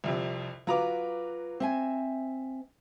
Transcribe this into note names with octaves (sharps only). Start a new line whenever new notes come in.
C2 F2 C3
F#3 F4 F#4 B4 A#5 D6
C4 E5 G#5